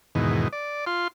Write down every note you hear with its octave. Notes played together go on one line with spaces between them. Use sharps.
E2 G#2 B2 D#3
D5
F4 C6